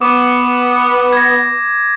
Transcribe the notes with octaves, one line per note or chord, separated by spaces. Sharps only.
B3 D6
G#6 A#6